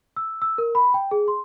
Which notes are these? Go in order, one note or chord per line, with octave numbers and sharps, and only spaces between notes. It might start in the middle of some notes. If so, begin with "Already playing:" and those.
E6
E6
A#4
B5
G5
G#4
C6